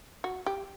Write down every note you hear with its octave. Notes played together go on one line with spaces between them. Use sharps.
F#4
G4